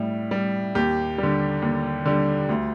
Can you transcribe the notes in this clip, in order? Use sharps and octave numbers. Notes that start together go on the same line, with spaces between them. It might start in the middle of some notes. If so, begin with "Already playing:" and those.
Already playing: A2 G3
G3
D#2 G4
D3 G3
D#2
D3 G3
D2